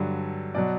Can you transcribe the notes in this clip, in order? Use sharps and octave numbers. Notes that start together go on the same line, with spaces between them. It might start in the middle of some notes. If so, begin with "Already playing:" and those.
Already playing: G2 D3 F#3
B2 F#3 D5